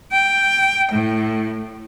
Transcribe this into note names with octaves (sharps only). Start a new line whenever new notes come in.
G5
A2